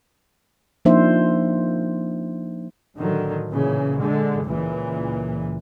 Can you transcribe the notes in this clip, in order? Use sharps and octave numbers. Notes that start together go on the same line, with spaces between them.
F3 A#3 D4 D#4 C5 E5
A2 D3 D#3 F#3
A#2 C#3 E3
D3 G#3
C#2 A#2 E3